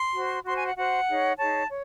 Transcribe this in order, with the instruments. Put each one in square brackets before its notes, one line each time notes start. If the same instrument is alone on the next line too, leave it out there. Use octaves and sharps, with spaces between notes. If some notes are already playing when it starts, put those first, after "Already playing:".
Already playing: [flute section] C6
F#4 C5
F#4 C5 C6
G#5
F#5
F#4 C5 F#5
D#4 G#4 C#5
D#4 G#4 C#5 A5
C#5